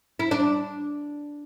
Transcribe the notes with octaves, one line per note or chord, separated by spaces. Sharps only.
E4
D4